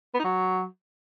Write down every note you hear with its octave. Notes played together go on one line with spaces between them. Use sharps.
B3
D#4
F#3